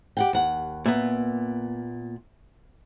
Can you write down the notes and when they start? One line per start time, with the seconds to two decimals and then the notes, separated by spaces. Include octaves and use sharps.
0.17 G4 F#5 G5
0.33 D#2 F#5
0.86 A#2 B3 E5